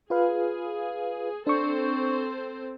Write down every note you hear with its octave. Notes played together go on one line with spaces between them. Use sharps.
F4 G#4 B4 F5
C4 D4 A4 C5 C#6